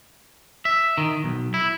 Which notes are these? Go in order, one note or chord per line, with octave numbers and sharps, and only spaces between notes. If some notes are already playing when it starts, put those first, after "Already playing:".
E5
D#3
B1
E4